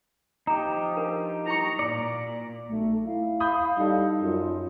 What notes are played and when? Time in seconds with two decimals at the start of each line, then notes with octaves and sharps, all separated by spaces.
0.47 F3 D#4 G4 A#5
0.97 D4 A#4
1.46 E4 A#5 C#6 C#7
1.79 A#2 D5 A#5
2.69 B1 A3
3.06 E4 F5
3.40 B5 D#6 G6
3.77 G3 D#4 A4
4.22 F#2 F4